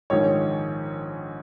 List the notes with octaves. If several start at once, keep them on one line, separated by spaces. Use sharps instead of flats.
A#1 G#2 D#3 C#5